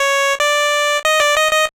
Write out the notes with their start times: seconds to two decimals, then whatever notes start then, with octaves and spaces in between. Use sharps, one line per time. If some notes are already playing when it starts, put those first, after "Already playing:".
Already playing: C#5
0.40 D5
1.05 D#5
1.20 D5
1.37 D#5
1.52 D#5